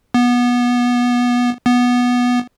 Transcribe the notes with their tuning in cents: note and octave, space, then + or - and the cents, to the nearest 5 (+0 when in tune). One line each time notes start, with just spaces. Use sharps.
B3 -20
B3 -10